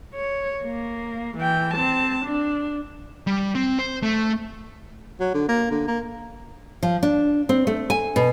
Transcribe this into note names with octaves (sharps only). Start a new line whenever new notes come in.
C#5
A#3
E3 G5
C4 A5
D4
G3
C4
C5
A3
F#3
D3
A#3
D3
A#3
F3
D4
C4
A3
G#5
B2